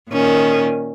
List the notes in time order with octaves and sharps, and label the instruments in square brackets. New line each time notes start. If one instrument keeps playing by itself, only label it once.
[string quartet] A#2 D#3 C#4